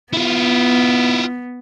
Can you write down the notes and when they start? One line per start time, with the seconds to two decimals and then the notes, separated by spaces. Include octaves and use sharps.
0.13 B3 E4 F4